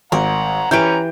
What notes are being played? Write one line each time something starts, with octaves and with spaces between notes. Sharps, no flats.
G#1 A#4 F#5 A#5
E3 C#4 G4 B4 A#5 G6 D7